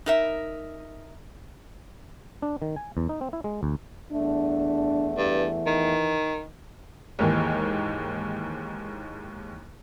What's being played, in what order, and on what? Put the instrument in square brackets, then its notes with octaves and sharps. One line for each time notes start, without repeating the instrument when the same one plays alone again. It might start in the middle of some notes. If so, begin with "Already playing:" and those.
[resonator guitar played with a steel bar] D#4 A#4 E5
[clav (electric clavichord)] D4
D#3
G#5
E2
D#4
C4
E4
G#3
D2
[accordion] E2 A3 [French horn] D4
[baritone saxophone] G2 [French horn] E3
[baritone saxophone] D#3
[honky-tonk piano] D#2 G#2 D#3 E3